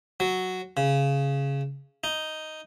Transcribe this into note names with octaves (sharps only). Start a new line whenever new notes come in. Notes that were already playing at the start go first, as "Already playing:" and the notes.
F#3
C#3
D#4